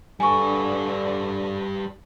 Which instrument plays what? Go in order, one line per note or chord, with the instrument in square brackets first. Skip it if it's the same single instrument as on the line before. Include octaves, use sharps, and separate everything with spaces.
[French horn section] D3 D4 [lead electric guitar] G3 B4 [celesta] G#5 C#6